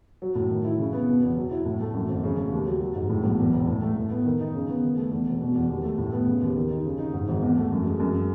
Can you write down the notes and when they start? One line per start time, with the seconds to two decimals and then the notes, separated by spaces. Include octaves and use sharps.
0.22 F#3
0.35 A2
0.50 D#3
0.65 E4
0.78 C#3
0.93 B3
1.08 B2
1.23 E2
1.36 F#3
1.51 E4
1.66 A2
1.80 A3
1.94 F#2
2.08 G#1
2.23 C#3
2.38 A3
2.52 D#2
2.67 F#3
2.81 F#3
2.96 G#2
3.09 A2
3.24 B1
3.39 E2
3.53 E1
3.67 A2
3.82 A3
3.96 A2
4.10 B3
4.25 D#3
4.40 D#4
4.54 C#3
4.69 B3
4.83 D#3
4.97 A3
5.11 E2
5.27 E1
5.41 B2
5.56 E2
5.69 D#2
5.84 A3
5.98 A2
6.12 B3
6.27 C#3
6.41 D#2
6.56 D#3
6.71 D#4
6.85 C#3
6.99 D#4
7.14 G#2
7.28 G#1
7.42 E2
7.58 A3
7.72 F#2
7.86 G#3
8.00 F#2